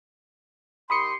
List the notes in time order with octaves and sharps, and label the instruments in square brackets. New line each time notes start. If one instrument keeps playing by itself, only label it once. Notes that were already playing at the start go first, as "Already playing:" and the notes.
[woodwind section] D#3 G4 C6 [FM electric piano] B5 D#6 C#7